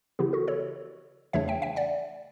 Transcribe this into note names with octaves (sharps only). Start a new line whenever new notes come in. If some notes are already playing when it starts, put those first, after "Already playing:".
C#3 E3 B3 E4 G4
F#4 A4
A4 C#5
E2 C#3 E3 A3 D4 C#5 E5
E5 G5
E5 G5
D5 F#5